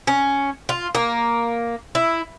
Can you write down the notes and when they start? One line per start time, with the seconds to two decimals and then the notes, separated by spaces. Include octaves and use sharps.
0.07 C#4
0.69 F4
0.95 A#3
1.95 E4